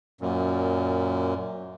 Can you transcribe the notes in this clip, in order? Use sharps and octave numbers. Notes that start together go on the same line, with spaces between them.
F#2 A#2